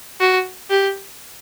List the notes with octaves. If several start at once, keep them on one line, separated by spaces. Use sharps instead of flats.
F#4
G4